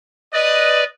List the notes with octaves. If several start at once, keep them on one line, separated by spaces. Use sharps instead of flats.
B4 D5 D#5